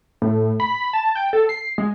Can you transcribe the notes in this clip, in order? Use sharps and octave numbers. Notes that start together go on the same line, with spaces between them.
A2
B5
A5
G5
A4
C7
G#3